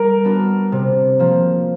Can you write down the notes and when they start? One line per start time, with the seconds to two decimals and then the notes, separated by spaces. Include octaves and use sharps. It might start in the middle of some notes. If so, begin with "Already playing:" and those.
Already playing: G3 A#4
0.24 B3 D4 F#4
0.72 C3
1.19 F3 A#3